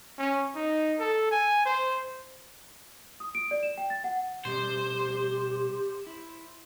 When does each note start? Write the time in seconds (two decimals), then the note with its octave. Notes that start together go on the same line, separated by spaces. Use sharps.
0.18 C#4
0.55 D#4
0.99 A4
1.31 G#5
1.65 C5
3.20 D#6
3.35 D7
3.51 D5
3.63 E7
3.78 G5
3.90 A6
4.04 F#5
4.45 B2 G3 C4 G4 C5
6.07 E4